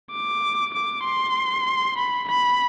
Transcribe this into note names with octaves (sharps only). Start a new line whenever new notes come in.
D6
D6
C6
B5
B5